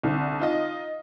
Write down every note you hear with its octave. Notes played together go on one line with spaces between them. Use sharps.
C2 D3
D#4 F4 D#5